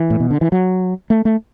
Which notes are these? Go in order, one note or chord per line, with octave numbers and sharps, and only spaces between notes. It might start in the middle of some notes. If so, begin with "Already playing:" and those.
Already playing: E3
A2
B2
D3
E3
F#3
A3
A3